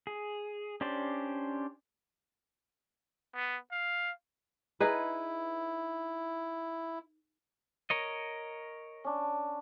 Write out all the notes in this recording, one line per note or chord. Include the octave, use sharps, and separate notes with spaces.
G#4
C#4 D4 G4 C5 D5
B3
F5
D#4 E4 G#4 B4
A#4 C#5 D#5
C#4 D4